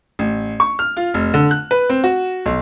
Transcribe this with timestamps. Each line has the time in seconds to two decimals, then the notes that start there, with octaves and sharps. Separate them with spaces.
0.19 A1
0.60 C#6
0.79 F6
0.97 F4
1.14 F1
1.34 D3
1.51 F#6
1.71 B4
1.90 C4
2.04 F#4
2.46 B1